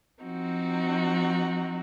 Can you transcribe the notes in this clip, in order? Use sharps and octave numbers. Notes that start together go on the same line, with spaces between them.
F3 C4 D#4 F#4